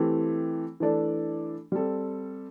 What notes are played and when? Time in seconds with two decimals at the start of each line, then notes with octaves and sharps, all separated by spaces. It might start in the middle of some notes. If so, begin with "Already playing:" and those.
Already playing: E3 A3 C4 G4
0.80 E3 A3 D4 A4 D5
1.72 G3 C4 A4